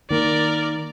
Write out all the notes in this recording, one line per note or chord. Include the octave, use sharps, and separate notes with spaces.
D#3 A#3 A#4 D5